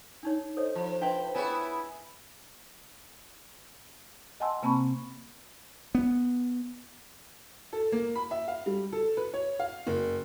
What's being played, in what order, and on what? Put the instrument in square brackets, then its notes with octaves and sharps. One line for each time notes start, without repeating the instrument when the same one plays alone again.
[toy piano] D4 D#4 C#5
[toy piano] A4 C#5 D#5 [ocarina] C5
[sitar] F3 [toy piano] F4 B5
[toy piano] D4 E5 C6 [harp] B4 G5
[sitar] B3 E4 B4 [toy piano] G#4 C#5 [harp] E5 G#5
[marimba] D#5 F#5 G#5 A5 C6 E6
C3 A#3 C4 A5 B5 C#6
[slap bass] B3
[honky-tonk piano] A4
A#3
B5
E5
F5
G3
A4
B4
C#5
F5
F#1